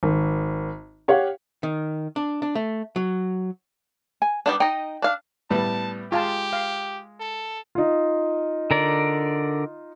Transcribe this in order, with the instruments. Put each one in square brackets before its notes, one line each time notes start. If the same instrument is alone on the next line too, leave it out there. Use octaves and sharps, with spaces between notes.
[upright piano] G#1
G4 C#5 F5 F#5
[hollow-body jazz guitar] D#3
D4
D4
A3
F#3
[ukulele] G#5
[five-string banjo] G3 B3 D4 [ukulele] B4
[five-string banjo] D#4 D#5 [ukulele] G5
[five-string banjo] D4 F5
[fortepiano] A2 G3 B3 [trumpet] A5
[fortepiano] G#3 [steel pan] F4 F5 A5 [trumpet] G4
[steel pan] F5
[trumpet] A4
[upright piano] D#4 F4
[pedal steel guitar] D3 A#4 D5